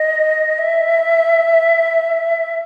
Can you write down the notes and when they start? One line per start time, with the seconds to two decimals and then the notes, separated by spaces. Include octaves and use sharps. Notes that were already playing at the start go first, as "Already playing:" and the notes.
Already playing: D#5
0.58 E5